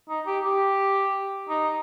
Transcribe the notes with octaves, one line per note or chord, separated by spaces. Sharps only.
D#4
G4
G4
D#4